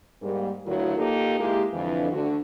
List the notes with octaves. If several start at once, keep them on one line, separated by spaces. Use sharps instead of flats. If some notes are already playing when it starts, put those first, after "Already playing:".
G#2 G3 A#3
D2 D3 F#3 E4 F4 A#4
A#3 D#4 F4 G4 A4
G#3 A#3 E4 G4
F2 D3 E3
D2 D3 F#4